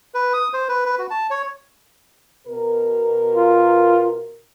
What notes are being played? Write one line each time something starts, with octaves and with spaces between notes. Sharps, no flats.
B4
D#6
C5
B4
B4
F#4
A5
C#5
B2 A#4
F4